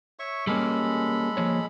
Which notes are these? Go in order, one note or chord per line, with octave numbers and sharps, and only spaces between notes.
C#5 E5 C#6
G3 G#3 A#3 C#4 A4 B5
F3 A#3 C#5